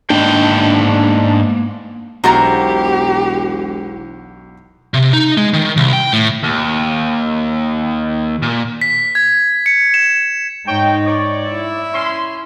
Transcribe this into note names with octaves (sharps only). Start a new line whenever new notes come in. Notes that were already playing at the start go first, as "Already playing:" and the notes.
G#2 A#3 B3 D4 D#5 G5
E1 B1 F#4 G4 A#4 C5 A#5 A6
C3
D#4
G#3
D#3
C2
G5
A2
D#2
A#2
B6
G#6
C#7
E7
G#2 D#4 C#5 G5
C#5 D5
E4 E5
C#4 C6